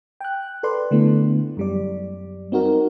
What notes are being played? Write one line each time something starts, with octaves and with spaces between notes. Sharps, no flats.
G5 F#6
A4 B4 D5 C6
D3 A3 B3 E4
F#2 G3 D5
C4 D#4 F#4 A#4